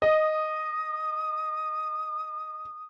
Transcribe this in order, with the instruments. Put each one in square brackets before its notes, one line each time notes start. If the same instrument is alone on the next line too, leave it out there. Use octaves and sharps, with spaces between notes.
[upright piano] D#5 [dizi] D#6